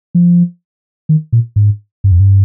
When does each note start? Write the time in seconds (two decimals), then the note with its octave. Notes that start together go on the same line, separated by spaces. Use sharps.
0.15 F3
1.09 D#3
1.32 A#2
1.56 G#2
2.04 G2
2.12 F2
2.20 G2